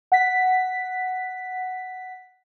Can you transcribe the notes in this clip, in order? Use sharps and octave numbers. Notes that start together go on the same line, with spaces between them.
F#5 B6